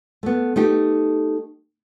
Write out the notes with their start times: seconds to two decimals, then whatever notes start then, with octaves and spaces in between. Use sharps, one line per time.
0.23 A3 B3
0.56 A3 D#4 G4